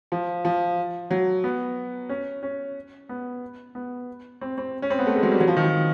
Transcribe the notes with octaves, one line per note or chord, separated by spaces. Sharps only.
F3
F3
F#3
B3
C#4
C#4
B3
B3
C4
C4
C#4
C4
B3
A3
G#3
F#3
G3
F#3
F3
D#3
F3